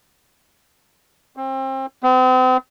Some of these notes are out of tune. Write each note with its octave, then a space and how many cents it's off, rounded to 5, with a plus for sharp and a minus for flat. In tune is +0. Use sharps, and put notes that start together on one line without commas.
C4 +30
C4 -40